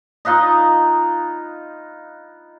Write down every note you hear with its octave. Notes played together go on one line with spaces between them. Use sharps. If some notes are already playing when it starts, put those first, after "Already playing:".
D#4 F4 B4 D#5